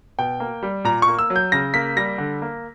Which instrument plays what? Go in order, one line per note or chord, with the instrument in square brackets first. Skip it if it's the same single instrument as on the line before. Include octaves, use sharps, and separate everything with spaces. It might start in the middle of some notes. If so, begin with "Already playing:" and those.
[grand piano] B2 G5
A#3
G3
A#2 A#5
C#6
A#3
E6
F#3
G6
C#3 A#6
A#3 B6
G3 A#6
D3
A#3